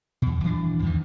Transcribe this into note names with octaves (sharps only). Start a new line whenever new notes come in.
E2 B2
D#1 E3 C4 D4
E2 G#2 D#3 E3